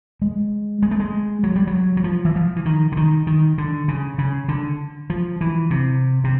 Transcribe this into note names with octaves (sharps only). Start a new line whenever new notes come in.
G#3
G#3
A3
G#3
F#3
G3
F#3
F#3
F3
E3
F3
E3
D#3
D3
D#3
D#3
D3
C#3
C#3
D3
F3
E3
C3
C3